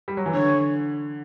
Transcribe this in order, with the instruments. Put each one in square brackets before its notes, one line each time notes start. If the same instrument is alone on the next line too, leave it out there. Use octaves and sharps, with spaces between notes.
[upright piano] G3
F#3
E3
[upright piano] D3 [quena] C#5